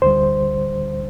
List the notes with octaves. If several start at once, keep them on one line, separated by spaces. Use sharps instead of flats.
D2 D3 G3 C5